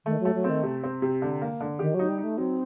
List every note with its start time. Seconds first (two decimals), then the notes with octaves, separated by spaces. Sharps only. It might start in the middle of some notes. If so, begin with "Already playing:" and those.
0.06 D#3 A3
0.20 F#3 A3
0.35 F#3
0.44 C4
0.50 D#3
0.63 C3
0.84 C4
1.02 C3
1.22 D3
1.42 A#3
1.61 D3
1.79 D#3 G4
1.94 F#3 D#4
2.09 G3
2.18 D#4
2.23 A3
2.38 F#3 C4